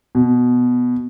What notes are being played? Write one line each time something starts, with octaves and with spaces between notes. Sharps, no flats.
B2